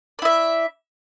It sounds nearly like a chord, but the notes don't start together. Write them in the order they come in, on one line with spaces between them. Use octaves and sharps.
D5 E4 E5